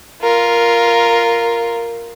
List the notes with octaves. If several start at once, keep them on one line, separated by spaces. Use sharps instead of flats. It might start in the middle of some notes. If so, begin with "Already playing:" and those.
F4 A#4